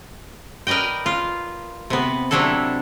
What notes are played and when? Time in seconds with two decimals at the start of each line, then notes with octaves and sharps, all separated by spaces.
0.67 A#4 B4 D5 D#5 G5
1.06 F4
1.90 C3 B3
2.31 C3 F#3 D4 E4 A4